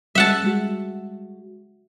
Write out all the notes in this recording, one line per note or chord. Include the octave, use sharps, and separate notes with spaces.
G3 G#3 E5 F#5 A5
G3 G#3 F#4